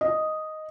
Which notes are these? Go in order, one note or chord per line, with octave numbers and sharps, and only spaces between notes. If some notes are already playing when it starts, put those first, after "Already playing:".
D#5